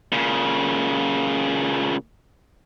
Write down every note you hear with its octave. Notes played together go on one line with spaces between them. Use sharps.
A#2 C#3